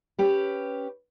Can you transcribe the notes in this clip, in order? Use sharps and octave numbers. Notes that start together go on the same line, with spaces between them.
C#4 G4 B4